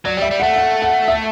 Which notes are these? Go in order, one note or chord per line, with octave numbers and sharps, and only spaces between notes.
F#3 D5
G3 E5
G3
F#5
A3
F#5
F#5
E5